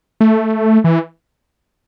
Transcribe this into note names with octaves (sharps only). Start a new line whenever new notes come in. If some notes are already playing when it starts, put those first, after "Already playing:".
A3
E3